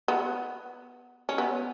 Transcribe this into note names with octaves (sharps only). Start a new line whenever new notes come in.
B3
C#4
B3